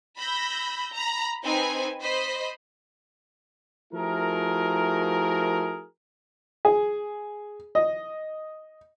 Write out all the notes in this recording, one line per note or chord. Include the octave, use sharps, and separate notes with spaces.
B5 E6 G6 A#6
A#5 B5
C4 D#4 B4 G#5
C5 D#5 B5 B6
F3 A3 E4 F#4 G#4 A#4
G#4
D#5